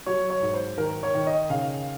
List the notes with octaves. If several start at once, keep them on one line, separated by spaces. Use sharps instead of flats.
F#3 C#5
C#5
G#2
C5
D#3 A#4
C#5
D#3
D#5
C#3 F5